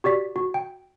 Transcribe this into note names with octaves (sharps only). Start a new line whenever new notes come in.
F#4 G4 D5 B6
F#4
G5